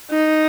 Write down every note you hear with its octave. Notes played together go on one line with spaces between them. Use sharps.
D#4